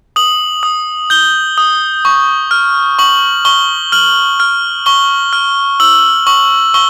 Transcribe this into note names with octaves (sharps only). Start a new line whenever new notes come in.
D#6 F#7
D#6
G6 G7
D#6
C#6
F6
C#6 F#7
C#6 G7
F6 F#7
F6
C#6 G7
F6
E6 F#7
C#6 F#7
C#6 G7